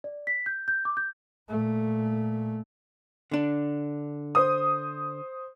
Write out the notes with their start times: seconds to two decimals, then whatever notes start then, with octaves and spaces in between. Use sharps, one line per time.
0.04 D5
0.27 B6
0.46 G6
0.68 G6
0.85 D6
0.97 G6
1.49 A#2 A3
3.31 D3 D4
4.35 C5 D#6